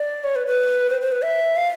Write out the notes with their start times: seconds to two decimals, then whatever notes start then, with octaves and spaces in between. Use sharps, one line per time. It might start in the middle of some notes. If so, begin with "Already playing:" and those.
Already playing: D5
0.24 C#5
0.36 B4
0.47 B4
0.90 C5
1.01 C5
1.12 B4
1.23 E5
1.56 F5